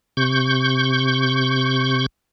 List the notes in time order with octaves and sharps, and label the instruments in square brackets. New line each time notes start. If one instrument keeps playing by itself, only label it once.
[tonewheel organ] C3 C#6 G6